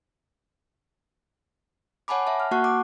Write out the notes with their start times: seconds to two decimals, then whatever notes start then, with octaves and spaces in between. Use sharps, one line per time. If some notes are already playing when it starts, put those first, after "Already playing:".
2.08 C#5 F#5 G#5 A5 B5 D6
2.27 E5 A5
2.40 F6
2.51 A#3 F#4 F#5 A5 C#6 F#6
2.64 D6